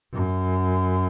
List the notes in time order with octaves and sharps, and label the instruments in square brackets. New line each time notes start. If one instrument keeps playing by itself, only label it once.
[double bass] F#2